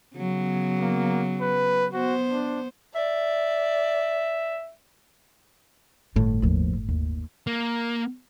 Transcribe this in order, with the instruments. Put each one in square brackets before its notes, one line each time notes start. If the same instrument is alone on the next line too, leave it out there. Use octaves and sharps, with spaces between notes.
[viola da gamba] C#3 F#3 B3
[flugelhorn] A#3
B4
[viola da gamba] B3 C5 [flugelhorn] F#4
[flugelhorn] D4
[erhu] D5 [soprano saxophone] E5
[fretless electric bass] G1 A2 [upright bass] D#3
[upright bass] D#2 F3
D#2
[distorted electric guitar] A#3